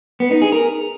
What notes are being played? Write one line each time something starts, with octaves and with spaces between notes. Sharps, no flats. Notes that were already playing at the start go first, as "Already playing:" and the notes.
B3
D#4
G#4
A#4